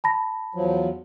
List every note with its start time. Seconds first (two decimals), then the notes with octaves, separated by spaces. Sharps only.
0.04 A5 B5 A#6
0.55 E2 F3 F#3